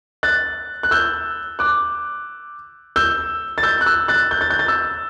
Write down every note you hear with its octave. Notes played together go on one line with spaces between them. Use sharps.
F#6 A6
F#6
E6 G6
D6 F#6
E6 G6
A6
E6 G6
F#6
E6 G6
F#6 A6
G6
A6
G6
A6
E6 G6